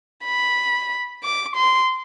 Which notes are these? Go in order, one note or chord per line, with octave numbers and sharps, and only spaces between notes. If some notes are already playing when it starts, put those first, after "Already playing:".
B5
D6
C6